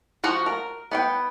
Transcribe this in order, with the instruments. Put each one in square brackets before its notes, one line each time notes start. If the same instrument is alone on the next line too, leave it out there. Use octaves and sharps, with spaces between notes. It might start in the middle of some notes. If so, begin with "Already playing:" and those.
[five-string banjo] F3 F4 F#4 F#5
A#4
B3 F#5 G5